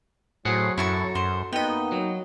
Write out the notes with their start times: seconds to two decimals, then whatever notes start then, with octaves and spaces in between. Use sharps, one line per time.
0.45 A2 F#3 G#4 C5 F#5
0.78 F#2 E4 F#4 A4 A5 C#6
1.15 F#2 C5
1.53 A#3 B3 D#4 D#5 G5
1.92 F#3